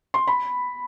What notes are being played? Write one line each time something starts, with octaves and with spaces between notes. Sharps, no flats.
C6
B5